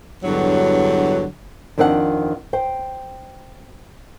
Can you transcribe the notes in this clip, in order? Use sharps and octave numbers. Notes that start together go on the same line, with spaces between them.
E2 G2 D3 F#3
F2 D#3 C4 D4 G#4 F#5
C5 G5